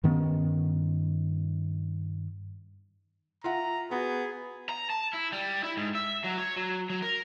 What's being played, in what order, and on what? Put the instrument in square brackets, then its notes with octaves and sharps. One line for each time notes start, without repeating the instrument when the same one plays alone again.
[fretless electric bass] G2 D#3 B3 C#4
[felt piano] F4 E5 F#5 [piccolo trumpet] A#5
[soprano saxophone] B3 [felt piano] F#4 [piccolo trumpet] G#4
[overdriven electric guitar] A#5
A5
E4
G3
E4
G#2
E5
F#3
C#5
F#3
F#3
A#4